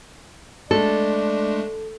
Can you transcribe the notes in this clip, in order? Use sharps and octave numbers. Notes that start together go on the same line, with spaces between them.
G#3 A3 D4 A4 D5